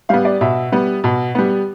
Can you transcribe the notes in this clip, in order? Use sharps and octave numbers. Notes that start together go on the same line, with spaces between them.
G3 B3 F5
D5
B2 E5
G3 B3
B2
G3 B3